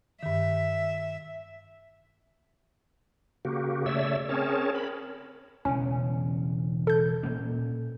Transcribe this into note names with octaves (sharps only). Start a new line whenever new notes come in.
G2 D#3 E5
C#3 A#3 F#4 G4
C#3 A3 C#5 D5 E5 E6
C4 C#4 G#4 A#4 C#5 A5
A#4 B5
E1 E2 C#3 C#4
A4 G6
A#2 A#3 C#4